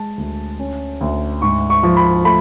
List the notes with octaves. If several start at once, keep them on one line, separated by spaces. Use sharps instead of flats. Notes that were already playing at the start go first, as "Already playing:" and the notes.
Already playing: G#3 A5
D2
C#4
D2
G#2 C#6
C#6
F3
B5
A3 B5